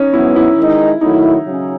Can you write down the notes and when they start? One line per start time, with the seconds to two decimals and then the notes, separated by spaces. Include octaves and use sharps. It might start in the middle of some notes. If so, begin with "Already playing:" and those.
Already playing: C#4 D#4
0.13 G#2 F#3 B3 E4
0.36 E4
0.58 D#3 G#3 D#4
1.01 D#3 F#3 A3 D#4 E4
1.44 C#3 F#3 C#4